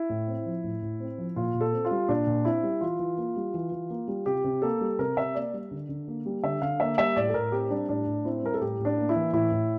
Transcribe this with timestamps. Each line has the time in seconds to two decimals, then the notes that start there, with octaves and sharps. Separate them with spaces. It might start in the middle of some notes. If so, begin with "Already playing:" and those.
Already playing: E4
0.10 A2
0.27 C4
0.46 F3
0.64 A2
0.82 A2
1.00 C4
1.18 F3
1.36 A#2 F4
1.54 A#2
1.61 A4
1.73 C4
1.85 F4
1.91 G3
2.09 A#2 D4
2.27 A#2
2.45 C4 E4
2.63 G3
2.81 E3 F4
2.99 E3
3.18 A#3
3.36 G3
3.54 E3
3.72 E3
3.90 A#3
4.08 G3
4.26 C3 G4
4.44 C3
4.62 A#3 A4
4.81 G3
4.99 C3 A#4
5.17 C3 E5
5.35 A#3 D5
5.53 G3
5.71 D3
5.89 D3
6.08 A#3
6.26 G3
6.43 D3 E5
6.62 D3 F5
6.80 A#3 E5
6.98 G3 E5
7.16 A2 D5
7.29 A4
7.34 A2 A#4
7.52 C4 G4
7.70 G3 D4
7.89 A2 D4
8.07 A2
8.25 C4 E4
8.38 C5
8.43 G3 A#4
8.54 A4
8.61 A2 G4
8.79 A2
8.85 D4
8.98 A#3
9.09 E4
9.15 E3
9.33 A2 E4
9.52 A2